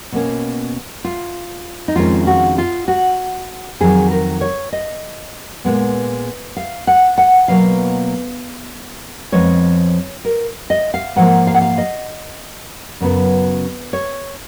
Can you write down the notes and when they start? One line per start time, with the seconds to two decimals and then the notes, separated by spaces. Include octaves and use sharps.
0.12 B2 A#3 C#4
1.05 F4
1.88 D#4
1.96 F2 D#3 G#3 C#4 F4
2.27 F#4
2.58 F4
2.88 F#4
3.80 F2 D#3 F#3 G#4
4.11 A#4
4.41 C#5
4.72 D#5
5.65 A#2 G#3 B3
6.56 F5
6.87 F#5
7.18 F#5
7.48 B2 F#3 A#3 F5
9.32 F2 F3 G#3 B3 C#5
10.25 A#4
10.70 D#5
10.94 F5
11.16 G#2 F3 A#3 F#5
11.47 F5
11.54 F#5
11.62 F5
11.78 D#5
13.01 F#2 C#3 F#3 B3
13.93 C#5